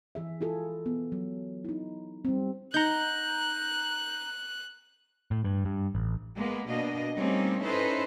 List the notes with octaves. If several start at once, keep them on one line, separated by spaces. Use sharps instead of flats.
E3 G#4 E5
E4 F4 G#4 A4
B3
F#3
D#4 E4
G3 C4
D#4 F#5 A#5 F#6 G6
A2
G2
G2
A1
G#3 A#3 B3
B2 A#3 D4 D#5
G3 A3 A#3 C4 C#4 D#4
C#4 D#4 E4 A4 B4 C5